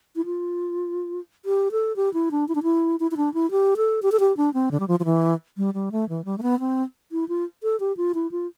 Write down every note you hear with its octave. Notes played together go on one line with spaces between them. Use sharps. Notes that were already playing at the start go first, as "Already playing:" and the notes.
E4
F4
G4
A4
G4
E4
D4
E4
D4
E4
E4
E4
D4
E4
G4
A4
G4
A4
G4
D4
C4
D3
G3
F3
F3
E3
G3
G3
A3
E3
G3
A3
B3
C4
E4
F4
A4
G4
F4
E4
F4